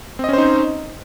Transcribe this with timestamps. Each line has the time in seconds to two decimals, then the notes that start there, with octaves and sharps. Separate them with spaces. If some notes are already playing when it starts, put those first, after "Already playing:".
0.19 C4
0.24 D#5
0.29 C#4
0.33 C5
0.38 D#4